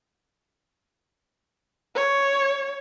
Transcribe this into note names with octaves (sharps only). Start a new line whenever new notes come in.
C#5